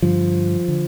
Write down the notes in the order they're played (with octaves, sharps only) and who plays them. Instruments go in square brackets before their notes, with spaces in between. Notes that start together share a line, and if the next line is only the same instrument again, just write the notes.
[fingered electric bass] G2 D3 F3
D3